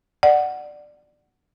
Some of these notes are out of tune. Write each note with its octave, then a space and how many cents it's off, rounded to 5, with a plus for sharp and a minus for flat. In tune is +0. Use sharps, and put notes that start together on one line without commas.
D5 +15 F#5 +0